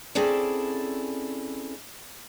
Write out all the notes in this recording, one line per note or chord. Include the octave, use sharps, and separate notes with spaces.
C4 C#4 E4 G#4 A4 D5